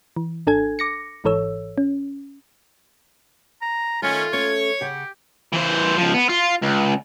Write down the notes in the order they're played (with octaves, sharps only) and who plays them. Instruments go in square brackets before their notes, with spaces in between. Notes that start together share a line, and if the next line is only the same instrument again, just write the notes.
[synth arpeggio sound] E3
G#1 D4 A4 G#5 G#6
D6 A#6 C#7
G#1 G#2 E3 A4 C#5 E6
C#4
[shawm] A#5
[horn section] D#3 C#4 [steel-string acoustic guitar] A3 [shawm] F4
[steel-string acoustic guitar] A3 C#4 [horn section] C#5
[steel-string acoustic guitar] C#3 F#5 [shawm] G4
[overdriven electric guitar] E3 C5
C#2 F3
B3
F4
C#2